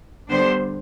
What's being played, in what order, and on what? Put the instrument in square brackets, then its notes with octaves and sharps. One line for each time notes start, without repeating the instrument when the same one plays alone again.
[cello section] D3 G3 B3 D4 C5